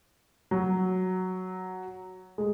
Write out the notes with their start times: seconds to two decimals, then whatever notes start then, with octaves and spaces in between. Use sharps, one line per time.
0.51 F#3
2.38 G#3